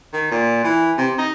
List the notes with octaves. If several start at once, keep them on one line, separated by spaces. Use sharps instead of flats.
D#3
A#2
E3
C3
D#4